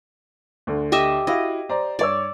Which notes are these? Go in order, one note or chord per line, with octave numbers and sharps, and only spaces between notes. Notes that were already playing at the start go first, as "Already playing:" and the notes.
D2 D3
G4 D#5 E5
E4 F#4 D#5 F5
C5 D5 A#5
G2 C#5 D5 E6